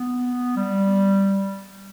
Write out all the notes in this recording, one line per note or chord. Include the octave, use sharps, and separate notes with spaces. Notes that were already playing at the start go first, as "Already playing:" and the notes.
Already playing: B3
G3